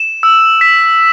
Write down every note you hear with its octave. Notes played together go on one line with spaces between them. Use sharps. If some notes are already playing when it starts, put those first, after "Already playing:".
Already playing: E7
E6
B6